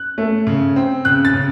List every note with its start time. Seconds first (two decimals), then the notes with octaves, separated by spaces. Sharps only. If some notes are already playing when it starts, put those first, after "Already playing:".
Already playing: F#6
0.18 A3
0.47 C#3
0.76 C4
1.05 C#3 F#6
1.25 A6
1.34 C#3